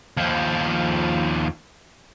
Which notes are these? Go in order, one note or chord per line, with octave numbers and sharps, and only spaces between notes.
D#2 F3